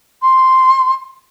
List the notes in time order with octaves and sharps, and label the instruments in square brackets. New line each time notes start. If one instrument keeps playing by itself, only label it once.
[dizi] C6